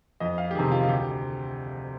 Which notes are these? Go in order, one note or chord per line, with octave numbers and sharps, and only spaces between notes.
F2 D#5
F5
G4
C3 D#3 G#4
F4
F4
D2 G4